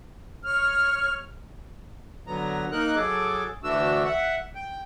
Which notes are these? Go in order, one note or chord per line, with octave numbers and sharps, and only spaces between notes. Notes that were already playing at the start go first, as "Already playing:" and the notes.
C#5 F6
D3 F#3 B3 A#5
A#3 D#4 A#4 F#6
F#3 G#4 A4 D6
D2 E3 A3 D4 F#4 E6
E5 F#5
G5